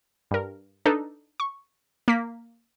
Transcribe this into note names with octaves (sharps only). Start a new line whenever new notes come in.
G2 A#4
D4 D#4 A4 B4
C#6
A#3 B6